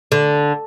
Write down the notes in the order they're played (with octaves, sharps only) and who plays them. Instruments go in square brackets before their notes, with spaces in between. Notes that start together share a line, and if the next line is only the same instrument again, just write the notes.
[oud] D3